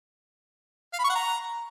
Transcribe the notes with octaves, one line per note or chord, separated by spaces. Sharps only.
F5
B5
C#6
F#5
A#5